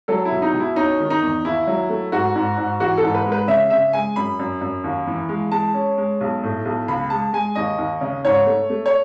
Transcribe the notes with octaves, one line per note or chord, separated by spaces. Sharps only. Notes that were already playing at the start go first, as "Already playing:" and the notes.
F#3 A4
E4
B2
D#4
B2
E4
C#4 D#4
D#3
D#4
E2
D#2 E4
F#3
A3
G#2 F#4
G#2
G#2
E3 F#4
A4
G#2
B4
G#3
B4
C#3 E5
C#3 E5
G#3 G#5
F#2 B5
F#2
F#2
D#2
E3
G#3
G#3 A5
C#4
G#3
B1
A2
B1
C#2 B5
G#3 A5
G#3 G#5
D#2 D#5
D#2
C#3
G#2 C#5
A3
A3
C#5